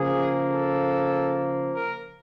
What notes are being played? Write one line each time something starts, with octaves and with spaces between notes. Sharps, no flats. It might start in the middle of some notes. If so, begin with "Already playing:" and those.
Already playing: C#3 F3 A#3 G#4
A4
A#4